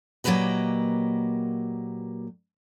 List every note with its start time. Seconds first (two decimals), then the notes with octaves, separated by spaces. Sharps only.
0.24 A#2 F#3 A#3 G4 B4 D#5